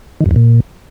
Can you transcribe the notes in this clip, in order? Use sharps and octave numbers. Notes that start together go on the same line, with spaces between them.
D#3
F#2
E2
A#2